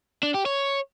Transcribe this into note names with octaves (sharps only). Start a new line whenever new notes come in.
D4
G4
C#5